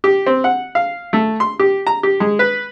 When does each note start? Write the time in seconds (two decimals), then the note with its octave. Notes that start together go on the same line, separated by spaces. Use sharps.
0.04 G4
0.26 C4
0.44 F#5
0.75 F5
1.13 A3
1.40 C6
1.59 G4
1.87 A#5
2.03 G4
2.20 G#3
2.39 B4